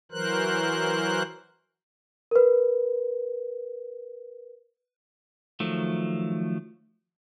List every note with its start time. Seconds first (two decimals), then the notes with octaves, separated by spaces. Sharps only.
0.12 E3 F#3 A#4 C5 F#6
2.31 A#4 B4
5.60 D#3 F3 F#3 A3